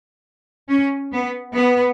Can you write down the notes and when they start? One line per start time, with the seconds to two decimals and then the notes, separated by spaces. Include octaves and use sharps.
0.69 C#4
1.12 B3
1.54 B3